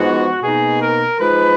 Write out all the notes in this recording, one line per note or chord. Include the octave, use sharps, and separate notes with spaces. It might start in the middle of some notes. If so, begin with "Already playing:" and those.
Already playing: G#2 F3 G#3 B3 F#4
B2 A#3 D#4 G#4
A#4
F3 G#3 D#4 B4